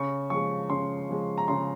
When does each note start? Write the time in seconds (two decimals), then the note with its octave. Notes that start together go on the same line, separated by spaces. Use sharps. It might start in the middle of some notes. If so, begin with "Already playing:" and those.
Already playing: C#3 C#6
0.30 F3 G#3 C#6
0.69 C#3 C6
1.09 F3 G#3
1.38 A#5
1.48 C#3 C6